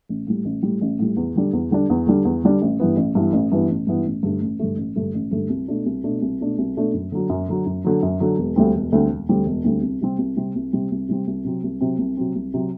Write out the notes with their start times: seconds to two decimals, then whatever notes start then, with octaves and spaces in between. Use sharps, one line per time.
0.09 A1
0.27 A2 G3
0.45 A1
0.63 A2 G3
0.81 A1
0.99 A2 G3
1.17 E2
1.36 D3 G3 D4
1.53 E2
1.71 D3 G3 D4
1.90 E2
2.07 D3 G3 D4
2.25 E2
2.43 D3 G3 D4
2.62 A1
2.80 G2 E3 B3
2.97 A1
3.15 G2 E3 B3
3.33 A1
3.52 G2 E3 B3
3.69 A1
3.87 G2 E3 B3
4.06 A1
4.23 G2 D3 A3
4.41 A1
4.59 G2 D3 A3
4.77 A1
4.96 G2 D3 A3
5.14 A1
5.31 G2 D3 A3
5.49 C2
5.68 B2 A3 D4
5.86 C2
6.04 B2 A3 D4
6.22 C2
6.41 B2 A3 D4
6.58 C2
6.77 B2 A3 D4
6.94 F#2
7.12 D3 F#3
7.30 F#2
7.48 D3 F#3
7.66 F#2
7.84 D3 F#3
8.03 F#2
8.20 D3 F#3
8.38 E1
8.56 D2 D3 G3 C4
8.75 E1
8.92 D2 D3 G3 C4
9.11 E1
9.29 D2 D3 G3 C4
9.46 E1
9.64 D2 D3 G3 C4
9.82 C2
10.01 C3 G3 C4
10.18 C2
10.37 C3 G3 C4
10.55 C2
10.73 C3 G3 C4
10.91 C2
11.09 C3 G3 C4
11.27 C2
11.44 C3 F#3 C4
11.64 C2
11.81 C3 F#3 C4
11.98 C2
12.17 C3 F#3 C4
12.35 C2
12.54 C3 F#3 C4